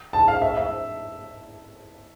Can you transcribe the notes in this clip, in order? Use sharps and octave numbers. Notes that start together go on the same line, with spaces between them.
A5
F5
E5
E5